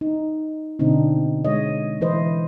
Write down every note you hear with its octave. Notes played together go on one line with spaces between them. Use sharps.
D#4
B2 D3 C4 D4 D#4
G#3 C#5 D#5
E3 E4 B4 C5 D#5